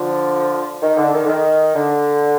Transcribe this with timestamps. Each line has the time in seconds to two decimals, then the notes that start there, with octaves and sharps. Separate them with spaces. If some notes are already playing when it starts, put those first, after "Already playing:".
Already playing: D3 F3
0.82 D#3
0.97 D3
1.13 D#3
1.24 D3
1.29 D#3
1.75 D3